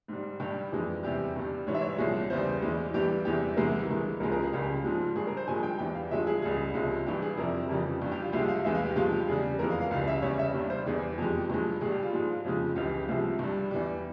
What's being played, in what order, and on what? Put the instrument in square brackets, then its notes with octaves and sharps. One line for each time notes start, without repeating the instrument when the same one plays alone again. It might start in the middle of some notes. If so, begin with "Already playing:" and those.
[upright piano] G#2 G3
G2 G3 G4
F2 E3 G#3
E2 C3 G3 G4
G2 G3
G#2 E3 G3 C#5
E5
C#5
C2 A#2 F3 G#3
E2 C#3 E3 G3 C5
E2 E3 G#3
G2 E3 G3 G4
E2 C3 E3 G#3 G4
C2 C3 E3 G#3 A#4
G2 E3 G#3
C#2 C#3 F3 G#3 A#4
A#4
G#4
C#2 C#3 G3 G4
G#2 F3 G#3
G2 G#4
G3
A#4
C5
G2 F3 G#3 G#5
G5
E2 E3 G3 G5
F5
G2 F3 G#3 E5
G#4
C#2 C#3 G3 G#4
C#2 C3 F3 G#3
G2 E3 G3 G4
G#4
F2 C3 G3 A#4
F2 C#3 E3 G3
G2 G3
G4
F4
C2 C3 F3 G#3 G4
F5
E2 E3 G#3 E5
F5
G4
G2 F3 G#3 F4
G4
E2 C#3 G3 G#4
F2 E3 G#3 A#4
F5
F5
C#2 C#3 G3 F5
E5
E2 C#3 G3 C#5
E5
G2 G3
C5
E2 E3 G3 G#4
F2 E3 G#3 G4
G2 F3 G#3
G2 G3 G#4
G4
F4
G#2 F3 G#3
F2 C#3 F3 G#3
C#2 C#3 E3 G4
C2 C3 F3 G#3
G2 G3
E2 E3 G3